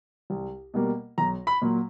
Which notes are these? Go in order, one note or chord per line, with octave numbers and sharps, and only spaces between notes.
C2
B2 G3 A#3
B1 A#5
B5
A#2 F#3 A#3